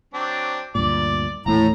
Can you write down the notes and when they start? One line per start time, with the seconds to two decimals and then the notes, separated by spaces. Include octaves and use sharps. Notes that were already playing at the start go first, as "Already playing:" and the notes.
0.14 F#3 C4 D4
0.75 D2 G2 A#2 D5
1.46 D#1 A2 E3 A3 A#5